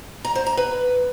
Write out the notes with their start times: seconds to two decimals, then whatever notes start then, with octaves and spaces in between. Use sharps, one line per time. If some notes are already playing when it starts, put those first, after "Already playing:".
0.25 A#5
0.35 C5
0.46 A#5
0.57 B4